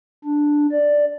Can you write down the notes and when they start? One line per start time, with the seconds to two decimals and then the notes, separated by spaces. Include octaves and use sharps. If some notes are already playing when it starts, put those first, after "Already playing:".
0.25 D4
0.72 D5